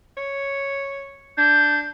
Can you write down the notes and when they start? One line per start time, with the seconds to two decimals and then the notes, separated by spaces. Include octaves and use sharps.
0.17 C#5
1.38 D4 G6